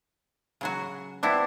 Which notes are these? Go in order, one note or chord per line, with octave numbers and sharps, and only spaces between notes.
C#3 F#3 F#4
B3 C4 D4 E4